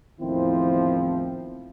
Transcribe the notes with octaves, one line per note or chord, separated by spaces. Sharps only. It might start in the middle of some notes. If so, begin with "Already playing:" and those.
E2 A2 D#3 F3 C4 E4